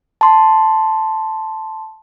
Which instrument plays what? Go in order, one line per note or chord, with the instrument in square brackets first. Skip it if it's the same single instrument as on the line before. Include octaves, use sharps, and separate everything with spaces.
[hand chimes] A5 C6